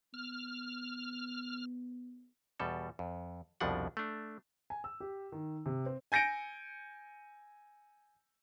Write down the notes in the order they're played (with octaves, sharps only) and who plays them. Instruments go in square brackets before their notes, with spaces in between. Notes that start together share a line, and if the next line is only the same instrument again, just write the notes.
[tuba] B3 [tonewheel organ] F6
[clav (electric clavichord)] E2 B2 G3 A4
F2
C2 F2 B2 F3 D4 F#5
A3 D4
[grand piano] G#5
E6
G4
D#3
C3
C4
[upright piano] G#5 G6 A#6 C#7 D7